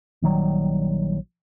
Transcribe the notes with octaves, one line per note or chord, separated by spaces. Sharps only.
A#1 D#3 F#3 G3